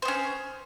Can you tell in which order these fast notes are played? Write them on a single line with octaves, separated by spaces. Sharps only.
C5 B3 C#4